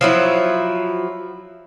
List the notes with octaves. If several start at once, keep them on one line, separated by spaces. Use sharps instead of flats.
F3 F#3 E4